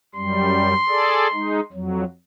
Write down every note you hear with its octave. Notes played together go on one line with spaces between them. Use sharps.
F#2 G3 C6
G#4 A4 D5
G#3 D#4
F2 F#3